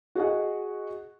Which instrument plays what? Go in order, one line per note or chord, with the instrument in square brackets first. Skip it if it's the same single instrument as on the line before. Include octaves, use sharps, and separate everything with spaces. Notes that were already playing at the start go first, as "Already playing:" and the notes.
[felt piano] F#4 G#4 D#5 F#5